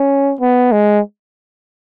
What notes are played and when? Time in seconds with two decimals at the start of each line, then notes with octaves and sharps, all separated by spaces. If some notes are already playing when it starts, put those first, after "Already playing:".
Already playing: C#4
0.41 B3
0.72 G#3